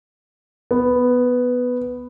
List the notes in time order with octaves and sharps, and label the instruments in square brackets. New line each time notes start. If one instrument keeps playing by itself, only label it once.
[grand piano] B3